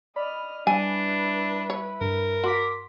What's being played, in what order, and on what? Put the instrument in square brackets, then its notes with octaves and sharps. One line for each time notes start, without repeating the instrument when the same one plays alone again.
[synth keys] D5 B5 [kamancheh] D#5 F6
[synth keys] G3 [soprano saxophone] D4 [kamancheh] E4 B4 [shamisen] G#5
[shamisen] C#5
[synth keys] G2 [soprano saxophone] A#4
[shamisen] F#4 [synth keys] C6 D6 B6